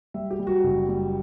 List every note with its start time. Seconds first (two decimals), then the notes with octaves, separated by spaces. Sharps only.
0.14 G3 E5
0.31 G4
0.39 G3
0.47 F#4
0.64 F#1
0.89 G3